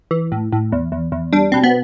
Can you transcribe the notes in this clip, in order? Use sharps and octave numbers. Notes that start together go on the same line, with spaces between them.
E3
A2
A2
E2
E2
E2
G3 D4
B2 C4
B3